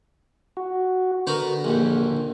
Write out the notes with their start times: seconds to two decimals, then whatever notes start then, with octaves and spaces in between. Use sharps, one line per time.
0.57 F#4
1.27 D3 B3 F#4 A#4
1.64 A#1 D#2